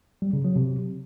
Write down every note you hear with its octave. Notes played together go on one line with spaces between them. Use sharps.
G3
C#3
F#3
C3